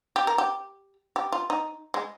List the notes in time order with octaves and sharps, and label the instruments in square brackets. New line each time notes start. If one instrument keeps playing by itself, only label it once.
[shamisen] G4
A#4
G4
G4
F4
D#4
G#3